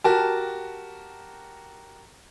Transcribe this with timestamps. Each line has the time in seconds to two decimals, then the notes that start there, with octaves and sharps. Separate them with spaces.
0.04 F#4 G4 A#4 A5